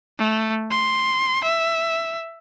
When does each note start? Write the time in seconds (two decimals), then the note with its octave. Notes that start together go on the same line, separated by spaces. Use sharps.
0.19 A3
0.71 C6
1.44 E5